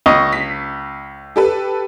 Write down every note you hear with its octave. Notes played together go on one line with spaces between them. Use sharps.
C#2 D#5 C#6
B6
G4 A4 B4